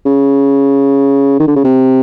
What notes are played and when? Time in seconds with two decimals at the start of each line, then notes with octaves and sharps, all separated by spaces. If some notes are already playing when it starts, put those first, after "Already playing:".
0.06 C#3
1.39 D#3
1.47 D3
1.56 C#3
1.64 C3